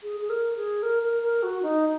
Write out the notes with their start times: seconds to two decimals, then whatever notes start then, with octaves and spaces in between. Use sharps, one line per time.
0.03 G#4
0.20 G#4
0.29 A#4
0.56 G#4
0.83 A#4
1.02 A#4
1.23 A#4
1.43 F#4
1.63 D#4